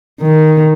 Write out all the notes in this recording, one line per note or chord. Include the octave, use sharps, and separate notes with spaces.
D#3